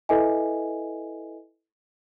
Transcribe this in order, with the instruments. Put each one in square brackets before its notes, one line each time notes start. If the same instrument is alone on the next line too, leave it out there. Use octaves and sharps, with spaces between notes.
[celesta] E4 A4 B4 D#5 E5 G#5